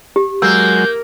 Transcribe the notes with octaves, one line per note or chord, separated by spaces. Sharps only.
G4
F#3 G#3 A#3 E6 G6